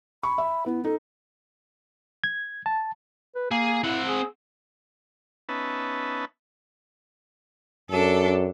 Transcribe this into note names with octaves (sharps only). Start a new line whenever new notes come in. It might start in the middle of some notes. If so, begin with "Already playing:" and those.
B5 C#6
E5
B3 E4
D#4 A4
G#6
A5
B4
A#3 G#4
C4 E4 F#5
G#4
B3 C#4 D#4 B4 E5 A5
F#2 D4 A4